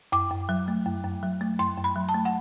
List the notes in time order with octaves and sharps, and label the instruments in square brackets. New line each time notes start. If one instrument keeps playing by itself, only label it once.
[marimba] F#2 D6
F#2
F#3
A3
F#2
F#2
F#3
A3
F#2 C6
F#2
B5
F#3
A5
A3
F#5